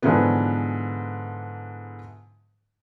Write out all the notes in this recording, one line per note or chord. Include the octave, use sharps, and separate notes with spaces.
G#2 D3 E3 F3 B3